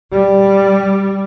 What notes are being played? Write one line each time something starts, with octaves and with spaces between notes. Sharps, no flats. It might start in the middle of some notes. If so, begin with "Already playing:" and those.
G3